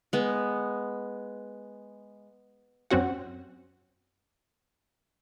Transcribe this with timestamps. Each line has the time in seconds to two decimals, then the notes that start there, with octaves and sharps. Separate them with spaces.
0.13 G#3 B3
2.91 F#2 C4 C#4 F#4 F#5